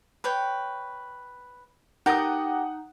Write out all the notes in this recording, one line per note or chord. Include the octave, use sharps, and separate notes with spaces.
B4 C#5 G5
D#4 G4 A#4 F#5 A5 D#6